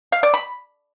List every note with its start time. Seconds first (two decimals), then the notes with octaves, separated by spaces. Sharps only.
0.12 F5
0.23 D5
0.34 B5